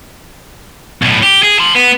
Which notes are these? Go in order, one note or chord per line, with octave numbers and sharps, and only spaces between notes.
B1 A2
G4
G#4
A5 C6
B3